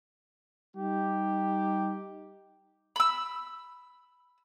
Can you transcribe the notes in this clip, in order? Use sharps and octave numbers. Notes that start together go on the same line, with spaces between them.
G3 D#4 G4
B5 E6